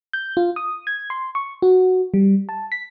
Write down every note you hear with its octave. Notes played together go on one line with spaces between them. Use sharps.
G6
F4
D#6
G#6
C6
C#6
F#4
G3
A5
B6